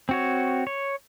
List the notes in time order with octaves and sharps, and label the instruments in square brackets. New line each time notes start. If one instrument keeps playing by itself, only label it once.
[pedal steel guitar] C4 F#4 C#5
C#5